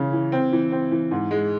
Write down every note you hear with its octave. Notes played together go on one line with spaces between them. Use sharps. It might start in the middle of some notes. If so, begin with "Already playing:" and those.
Already playing: C#3 E3 C#4
E3
C4
E3
C4
E3
G#2
G#3